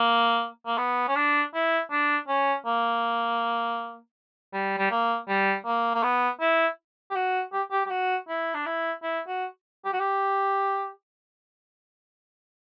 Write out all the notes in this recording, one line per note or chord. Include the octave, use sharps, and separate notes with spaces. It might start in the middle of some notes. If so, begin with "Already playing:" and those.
Already playing: A#3
A#3
B3
C#4
D4
E4
D4
C#4
A#3
G3
G3
A#3
G3
A#3
A#3
B3
E4
G4
F#4
G4
G4
G4
F#4
E4
D4
E4
E4
F#4
G4
F#4
G4